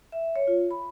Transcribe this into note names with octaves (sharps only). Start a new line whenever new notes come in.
E5
C#5
F4
B5